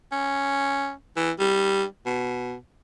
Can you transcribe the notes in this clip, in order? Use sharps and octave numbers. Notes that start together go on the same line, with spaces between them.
C#4
E3
G3
B2